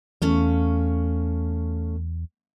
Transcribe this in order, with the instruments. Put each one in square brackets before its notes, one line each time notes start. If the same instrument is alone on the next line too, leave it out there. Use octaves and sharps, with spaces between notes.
[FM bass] E2 [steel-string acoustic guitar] A3 C#4 F5